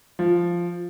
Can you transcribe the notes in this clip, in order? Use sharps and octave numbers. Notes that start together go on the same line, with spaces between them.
F3